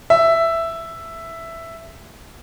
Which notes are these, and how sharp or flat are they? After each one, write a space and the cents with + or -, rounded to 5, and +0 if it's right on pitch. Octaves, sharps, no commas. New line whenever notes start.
E5 +5